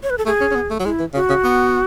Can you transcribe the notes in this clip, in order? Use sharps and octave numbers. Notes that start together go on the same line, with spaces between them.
C#5
B4
A4
A3 G#4
C#4
C#4
B3
A3
F#3
G#3 E4
E3
C#3 F#4
C#3
B3